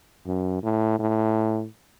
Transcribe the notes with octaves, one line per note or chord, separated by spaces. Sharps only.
F#2
A2
A2